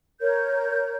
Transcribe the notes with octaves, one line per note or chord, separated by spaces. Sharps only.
A#4 C#5 G6